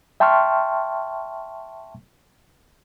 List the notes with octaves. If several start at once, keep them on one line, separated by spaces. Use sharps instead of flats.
E5 G5 A5 C6 C#6 F6